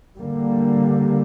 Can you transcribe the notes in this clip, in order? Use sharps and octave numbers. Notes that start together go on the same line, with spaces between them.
D3 G3 A#3